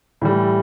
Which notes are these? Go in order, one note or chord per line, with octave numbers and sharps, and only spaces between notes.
A2 E3 G3